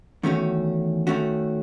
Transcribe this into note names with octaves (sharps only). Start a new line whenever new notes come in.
E2 D#3 A3 C#4 F#4
D#3 A3 C#4 F#4